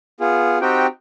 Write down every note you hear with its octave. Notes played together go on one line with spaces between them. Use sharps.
B3 F4 G#4
C4 D#4 F#4 G4 G5